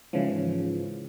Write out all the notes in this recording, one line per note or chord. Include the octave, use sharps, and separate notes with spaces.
G#2 C#3 E3 F3